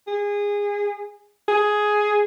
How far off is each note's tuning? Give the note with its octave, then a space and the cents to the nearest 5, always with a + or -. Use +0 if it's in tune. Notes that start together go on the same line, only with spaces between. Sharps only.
G#4 -20
G#4 +10